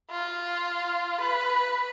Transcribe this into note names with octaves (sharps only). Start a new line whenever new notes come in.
F4
B4